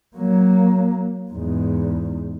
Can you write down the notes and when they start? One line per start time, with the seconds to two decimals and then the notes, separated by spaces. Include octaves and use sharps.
0.17 F#3 A#3
1.32 E2 G#2